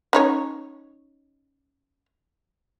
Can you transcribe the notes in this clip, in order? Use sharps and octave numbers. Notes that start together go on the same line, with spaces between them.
C#4 D#4 C#5